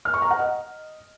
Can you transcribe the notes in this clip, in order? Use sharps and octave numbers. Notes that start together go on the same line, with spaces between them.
F6
C#6
A#5
F#5
D#5